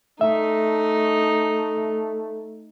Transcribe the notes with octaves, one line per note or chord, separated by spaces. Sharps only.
A3 D#4 E5